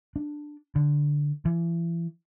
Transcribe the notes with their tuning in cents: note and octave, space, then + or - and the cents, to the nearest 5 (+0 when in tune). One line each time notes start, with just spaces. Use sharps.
D4 +10
D3 -5
E3 +35